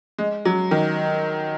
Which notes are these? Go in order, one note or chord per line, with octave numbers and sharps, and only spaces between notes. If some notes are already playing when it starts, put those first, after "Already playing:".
G#3
F#3
D#3